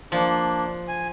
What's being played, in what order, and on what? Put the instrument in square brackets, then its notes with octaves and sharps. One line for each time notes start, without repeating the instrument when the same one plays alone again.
[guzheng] F3 [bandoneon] A#3 D4
[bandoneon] G#5